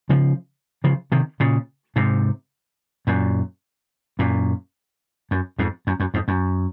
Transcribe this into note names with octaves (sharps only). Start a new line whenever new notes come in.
C#3 F3
C#3 F3
C3 D#3
A#2 C#3
G#2 C3
F#2 A#2
F#2 A#2
F#2
F2 G#2
F#2
F#2
F2 G#2
F#2